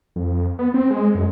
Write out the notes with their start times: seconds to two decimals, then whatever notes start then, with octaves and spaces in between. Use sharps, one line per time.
0.16 F2
0.59 B3
0.74 C4
0.90 G#3
1.15 F#2